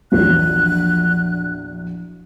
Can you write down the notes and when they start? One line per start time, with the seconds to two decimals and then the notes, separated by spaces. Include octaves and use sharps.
0.12 A#1 E2 F#3 F#6